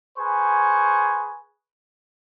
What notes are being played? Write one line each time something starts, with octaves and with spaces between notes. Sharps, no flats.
G#4 B4 C5 G#5 C#6